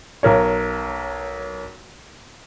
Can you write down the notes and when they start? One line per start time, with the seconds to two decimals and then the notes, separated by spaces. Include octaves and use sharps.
0.23 B1 A#4 C#5